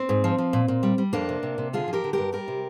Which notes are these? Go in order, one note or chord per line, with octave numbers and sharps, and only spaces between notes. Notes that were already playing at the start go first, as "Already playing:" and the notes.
Already playing: C4
G#2
F3
F3
A#2
A#2
G3
G3
F2 A#3 D4
C3
C3
C3
D3 F4 G#4
F3
G4 A#4
D3
G2 G4 A#4
G3 G4 A#4
C3